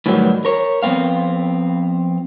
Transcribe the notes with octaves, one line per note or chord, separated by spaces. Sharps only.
A2 D#3 E3 F#3 G3
A#4 C#5
F2 F3 B3 C4 F5